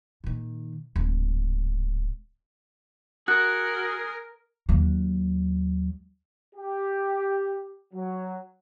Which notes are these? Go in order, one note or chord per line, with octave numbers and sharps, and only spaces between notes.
A#2 D#3
D1 G#2
F#4 G#4 A#4 F#6
D#2 F#3
G4
F#3